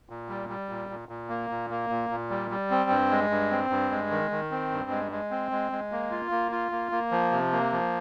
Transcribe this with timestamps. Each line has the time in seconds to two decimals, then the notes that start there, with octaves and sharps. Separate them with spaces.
0.09 A#2
0.29 G3
0.49 G3
0.69 A#2
0.89 A#2
1.09 A#2
1.29 A#3
1.50 A#2
1.70 A#3
1.89 A#2
2.10 A#2
2.30 G3
2.51 G3
2.71 C4
2.90 G2
3.11 G#3
3.30 G2
3.51 C4
3.70 G2
3.91 G#3
4.10 D#3
4.31 D#3
4.51 C4
4.71 G2
4.90 G#3
5.12 G#3
5.31 C4
5.51 G#3
5.72 G#3
5.92 A#3
6.11 F4
6.31 A#3
6.52 F4
6.72 A#3
6.92 A#3
7.11 F3
7.32 C3
7.52 A#3
7.72 F3